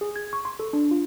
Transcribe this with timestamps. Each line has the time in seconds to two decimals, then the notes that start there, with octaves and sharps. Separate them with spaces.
0.01 G#4
0.16 G#6
0.33 C#6
0.45 C6
0.59 A4
0.73 D4
0.91 F4